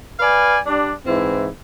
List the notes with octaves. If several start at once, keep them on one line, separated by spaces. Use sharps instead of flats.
B4 D5 F5 G#5
G3 D4
G#2 E3 C4 E4